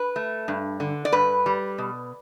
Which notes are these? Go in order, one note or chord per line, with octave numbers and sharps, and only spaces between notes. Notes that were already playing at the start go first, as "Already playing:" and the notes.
Already playing: B4
A3
G2
D3
D5
G2 B4
G3
B2